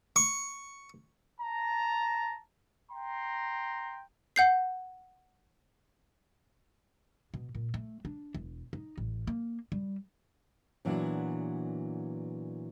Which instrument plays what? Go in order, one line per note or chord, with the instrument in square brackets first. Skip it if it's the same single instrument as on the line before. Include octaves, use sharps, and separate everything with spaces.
[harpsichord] C#6
[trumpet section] A5 A#5
G5 A#5 C6
[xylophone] F#5 G6 C7
[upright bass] B2
A#2
A3
D4
E1
D#4
A1
A#3
G3
[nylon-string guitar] A#2 E3 F#3 B3 D4